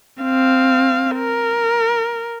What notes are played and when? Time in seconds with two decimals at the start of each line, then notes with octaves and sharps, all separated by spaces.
0.22 C4 F5
1.17 A#4